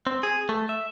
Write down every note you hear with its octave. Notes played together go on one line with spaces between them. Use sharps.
C4
G#4
A3
E5